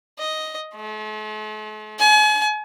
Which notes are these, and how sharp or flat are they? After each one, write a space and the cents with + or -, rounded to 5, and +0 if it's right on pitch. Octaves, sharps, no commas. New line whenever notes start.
D#5 +5
A3 -45
G#5 +40